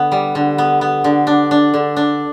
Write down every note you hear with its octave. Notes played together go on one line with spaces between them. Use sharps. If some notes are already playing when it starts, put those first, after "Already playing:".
Already playing: D3 B3
G3
D3
B3
B3
D3
D4
D4
D3
D4